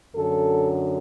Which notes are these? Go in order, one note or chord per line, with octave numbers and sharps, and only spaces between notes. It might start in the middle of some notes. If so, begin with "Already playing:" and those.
F#2 D3 F#3 A4